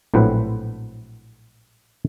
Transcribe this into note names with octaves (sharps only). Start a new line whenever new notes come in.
A#1 A2 F#3 C4 B4